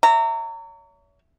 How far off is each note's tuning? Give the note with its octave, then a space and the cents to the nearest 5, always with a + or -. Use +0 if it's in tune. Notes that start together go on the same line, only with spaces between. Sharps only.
C#5 +35 E5 +0 A#5 -30